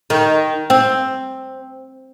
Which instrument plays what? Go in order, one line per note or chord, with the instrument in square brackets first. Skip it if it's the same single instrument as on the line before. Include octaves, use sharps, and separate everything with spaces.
[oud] D#3
C4